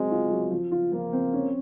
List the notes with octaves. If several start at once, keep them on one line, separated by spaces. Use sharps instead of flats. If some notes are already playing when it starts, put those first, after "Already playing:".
Already playing: F#3 G#3 C4
F4
F#3
F3
F4
F3 A#3
C4
C#4